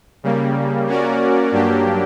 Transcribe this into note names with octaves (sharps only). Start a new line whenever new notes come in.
C#3 G3 A#3
A#3 C#4 F#4 A#4 D5
G2 F#3 A#3 D4 G4